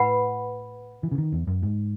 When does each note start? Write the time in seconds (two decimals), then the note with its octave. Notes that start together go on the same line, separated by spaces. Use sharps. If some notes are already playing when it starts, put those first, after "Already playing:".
Already playing: A2 B4 F#5 B5
1.03 E3
1.11 C#3
1.18 D#3
1.32 E2
1.47 F#2
1.63 G#2